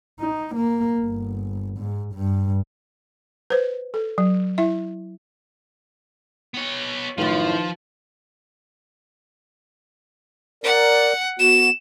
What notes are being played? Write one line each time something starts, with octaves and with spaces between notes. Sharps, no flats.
D#4
A#3
G1
G#2
G2
B4 C5
A4
F#3
E4 E5
B3 C#5
F#2 A2 D#3 F3 F4 B4
A#4 D5 F#5
B3 F#4 E7